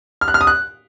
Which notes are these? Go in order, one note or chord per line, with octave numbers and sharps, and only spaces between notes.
F6
F#6
F6
D#6
F#6